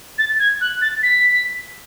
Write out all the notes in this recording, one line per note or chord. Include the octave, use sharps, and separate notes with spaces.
A6
G#6
F#6
A6
B6